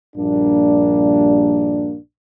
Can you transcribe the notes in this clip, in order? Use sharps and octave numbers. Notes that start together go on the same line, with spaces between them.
A#1 G2 G3 A#3 D4